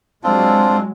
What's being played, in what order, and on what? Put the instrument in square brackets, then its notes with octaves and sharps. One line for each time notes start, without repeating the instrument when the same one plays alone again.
[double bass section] F#3 G#3 [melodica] C4 D4 F4